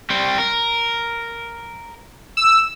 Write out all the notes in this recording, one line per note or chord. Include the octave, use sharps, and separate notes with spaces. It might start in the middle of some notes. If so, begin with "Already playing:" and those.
G3 C4
A#4
E6